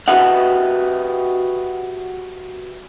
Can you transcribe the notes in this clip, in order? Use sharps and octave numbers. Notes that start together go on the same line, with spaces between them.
F#4 G4 B4 D#5 E5 F#5